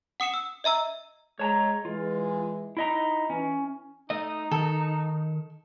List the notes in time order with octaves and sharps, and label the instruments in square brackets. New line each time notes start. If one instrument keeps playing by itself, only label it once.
[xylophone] F#5 D#6 C#7 E7
E6
D#5 E5 A#5 E6
[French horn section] G#3 [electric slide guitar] C#5 A5 A#5
[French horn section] E3 G#3 [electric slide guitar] F4
[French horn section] D#4 [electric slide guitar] E4 D#5 A#5
[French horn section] E3 [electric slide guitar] C#4
[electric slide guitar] A3 D#5 [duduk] D#4
[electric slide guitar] D#3 [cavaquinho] A4